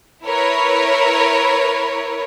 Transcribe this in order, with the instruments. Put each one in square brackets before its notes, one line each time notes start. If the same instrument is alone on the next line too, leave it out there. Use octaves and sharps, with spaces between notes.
[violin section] E4 A#4 B4 C#5